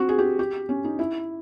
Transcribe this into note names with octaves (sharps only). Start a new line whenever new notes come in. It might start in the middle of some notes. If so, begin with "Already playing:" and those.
Already playing: C4 F#4
G#4
G4
G4
C#4
D#4
E4